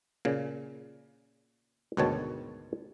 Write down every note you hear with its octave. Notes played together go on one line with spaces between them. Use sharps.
A#2 C#3
D2 G#2 B2 D#3 C#5 A5